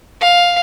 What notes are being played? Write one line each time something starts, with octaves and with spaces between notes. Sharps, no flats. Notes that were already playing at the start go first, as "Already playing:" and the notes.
F5